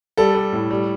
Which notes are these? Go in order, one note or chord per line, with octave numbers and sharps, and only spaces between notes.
G3 A4
G3
A2
G3